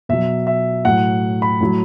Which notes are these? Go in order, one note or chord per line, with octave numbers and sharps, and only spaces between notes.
B2 F#3 E5
E5
A2 F#3 F#5
B5
A2 F#3